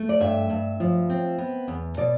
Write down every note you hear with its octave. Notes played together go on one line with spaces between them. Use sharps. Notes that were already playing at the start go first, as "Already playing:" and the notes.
Already playing: A3
D5
G2 E5
G2
F3
C4
B3
E2
B2 D5